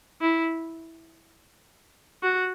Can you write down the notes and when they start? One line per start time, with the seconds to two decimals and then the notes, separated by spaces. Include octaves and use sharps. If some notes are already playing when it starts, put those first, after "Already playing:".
0.21 E4
2.23 F#4